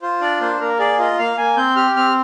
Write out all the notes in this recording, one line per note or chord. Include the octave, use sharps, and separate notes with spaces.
F4 C5
D4 D5
A#3 C5
A#3 A#4
G#4 D5
F4 D#5
A#3 F5
A#3 G#5
C4 G6
G4 F6
C4 F6